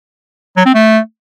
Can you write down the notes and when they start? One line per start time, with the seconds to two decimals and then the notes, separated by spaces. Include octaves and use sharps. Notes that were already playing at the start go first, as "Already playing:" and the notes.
0.57 F#3
0.66 C4
0.75 A3